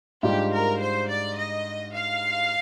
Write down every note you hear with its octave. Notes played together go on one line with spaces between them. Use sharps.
G#2 G3 D4 F4 G4
A#4
C5
D5
D#5
F5